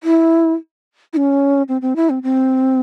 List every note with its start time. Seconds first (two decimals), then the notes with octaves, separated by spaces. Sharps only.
0.03 E4
1.13 E4
1.17 C#4
1.68 C4
1.81 C4
1.96 E4
2.10 C4
2.23 C4